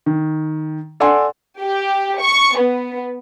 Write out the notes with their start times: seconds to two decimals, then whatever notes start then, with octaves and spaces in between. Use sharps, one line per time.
0.06 D#3
1.00 A4 D5 F#5 G#5 C6
1.61 G4
2.20 C#6
2.58 B3